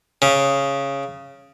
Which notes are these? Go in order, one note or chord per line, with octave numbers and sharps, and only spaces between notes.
C#3